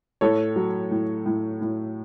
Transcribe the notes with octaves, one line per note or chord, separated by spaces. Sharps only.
A2 A4 C#5
F#3
A2
A2
A2